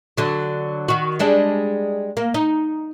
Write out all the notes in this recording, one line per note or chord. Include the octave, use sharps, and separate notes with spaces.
D3 F#3
D#3 F#4
G3 G#3 D4
A#3
D#4